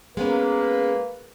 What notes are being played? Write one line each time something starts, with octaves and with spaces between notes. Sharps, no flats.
G#3 A#3 B3 C#4 B4